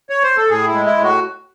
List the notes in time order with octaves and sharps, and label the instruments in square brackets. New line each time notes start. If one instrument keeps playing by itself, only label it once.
[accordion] C#5
C5
A4
A2 G#4
E4
G#3
E4
A2
F#4